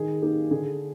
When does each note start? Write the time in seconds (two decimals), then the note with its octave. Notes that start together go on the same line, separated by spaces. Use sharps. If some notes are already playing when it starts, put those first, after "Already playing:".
Already playing: D#3 G#4
0.22 A#3 D#4 G4
0.51 D3 G#4